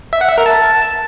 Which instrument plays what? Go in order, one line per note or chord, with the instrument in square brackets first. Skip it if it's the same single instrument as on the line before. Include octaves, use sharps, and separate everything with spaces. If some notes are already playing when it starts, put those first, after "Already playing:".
[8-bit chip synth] E5
F#5
E5
A#4
A5